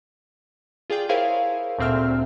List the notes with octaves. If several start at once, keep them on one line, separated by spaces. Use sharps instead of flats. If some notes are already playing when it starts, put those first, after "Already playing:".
F4 G#4 D5 G5
E4 G#4 A#4 C5 C#5 F5
D2 A#2 C4 E5 F6